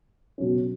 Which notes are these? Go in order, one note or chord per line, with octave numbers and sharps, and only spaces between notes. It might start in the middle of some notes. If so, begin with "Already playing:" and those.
B2 F#3 C#4